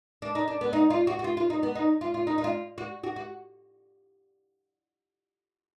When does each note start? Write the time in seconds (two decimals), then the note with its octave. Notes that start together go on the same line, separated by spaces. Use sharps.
0.22 D4
0.35 D#4
0.48 D4
0.61 B3
0.73 D#4
0.90 F4
1.07 F#4
1.19 F#4
1.24 F4
1.37 F4
1.50 D#4
1.63 B3
1.75 D#4
2.01 F4
2.14 F4
2.27 D#4
2.38 D#4
2.44 F4
2.78 F#4
3.04 F#4
3.16 F#4